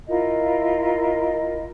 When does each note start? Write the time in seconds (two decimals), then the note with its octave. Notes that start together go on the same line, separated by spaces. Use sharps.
0.07 E4 F4 A#4 D#5